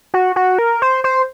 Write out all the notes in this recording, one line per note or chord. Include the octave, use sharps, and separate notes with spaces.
F#4
F#4
A#4
C5
C5